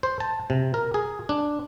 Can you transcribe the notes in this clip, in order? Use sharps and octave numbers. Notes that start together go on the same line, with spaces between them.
C5
A5
C3
A#4
G#4
D4